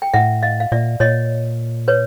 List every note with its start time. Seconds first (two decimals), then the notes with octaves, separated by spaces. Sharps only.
0.02 G5
0.14 A2 E5 F#5
0.43 D#5 F5
0.60 F5
0.72 A#2 D5 E5
1.00 A#2 C#5 D#5
1.88 B4 C#5